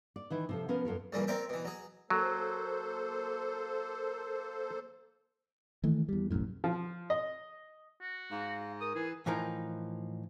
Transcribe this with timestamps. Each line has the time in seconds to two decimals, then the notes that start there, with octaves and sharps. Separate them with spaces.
0.16 D5
0.30 D#3 E3 E4
0.49 C3 F3 A4
0.68 F3 B3 C#4 F4 A#4
0.85 F#2 F4 A4 A#4
1.13 C2 G2 A#2 C#3 E3 F#3
1.27 C4 A#4 C#5 D5 E5 G5
1.49 B2 E3
1.65 F#3 G#4
2.10 F#3 A#3 A4 C5
5.84 D#3 E3 A3
6.09 E2 G3
6.31 F1 B1 F#2 A2
6.64 F3
7.10 D#5
8.01 F#4
8.31 G#2 F5
8.81 A#4 D#6
8.95 E3 G#4
9.26 A2 E3 F3 D#4 A#4